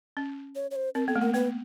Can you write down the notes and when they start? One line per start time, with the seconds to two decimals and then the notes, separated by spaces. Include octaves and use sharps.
0.17 C#4
0.55 C#5
0.71 C#5
0.76 C5
0.95 C4 A#4
1.08 B3 A4
1.16 A3
1.21 A#3 A#4
1.34 B3 B4